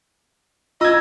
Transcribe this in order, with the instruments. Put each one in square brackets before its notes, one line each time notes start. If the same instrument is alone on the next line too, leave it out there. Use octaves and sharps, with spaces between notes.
[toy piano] F4 [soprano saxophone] D#5 [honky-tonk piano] E6 G#6